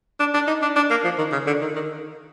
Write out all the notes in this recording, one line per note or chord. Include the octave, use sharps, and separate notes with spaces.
D4
D4
D#4
D4
D4
A#3
F3
D#3
C#3
D3
D#3
D#3